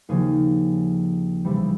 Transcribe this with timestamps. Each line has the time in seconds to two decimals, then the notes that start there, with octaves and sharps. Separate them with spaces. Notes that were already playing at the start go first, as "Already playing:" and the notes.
0.09 D#2 C#3 F3 G#4
1.44 C#2 C3 E3 G3